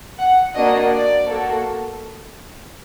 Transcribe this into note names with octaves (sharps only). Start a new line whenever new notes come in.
F#5
A#3 D4 F#4 D#5
D5
A#3 F#4 A4